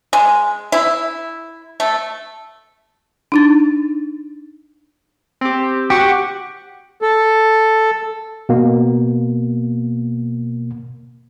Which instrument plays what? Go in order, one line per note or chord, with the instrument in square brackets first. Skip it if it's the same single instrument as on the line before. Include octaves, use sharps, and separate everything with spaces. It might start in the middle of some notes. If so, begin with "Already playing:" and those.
[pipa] G#3
E4
A3
[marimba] D4 D#4 A6
[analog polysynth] C4 G4
[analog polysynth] F#4 F#5 C#6 [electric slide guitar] G4
[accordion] A4
[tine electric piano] B2 A#3